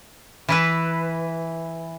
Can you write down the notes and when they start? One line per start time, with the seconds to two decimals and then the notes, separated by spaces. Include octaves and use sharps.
0.49 E3 E4 B4